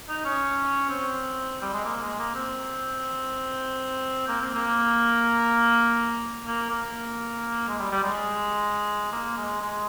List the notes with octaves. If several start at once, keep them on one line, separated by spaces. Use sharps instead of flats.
D#4
C#4
C4
G3
G#3
A#3
G#3
A#3
C4
A#3
C4
A#3
A#3
A#3
G#3
G3
G3
G#3
A#3
G#3
G#3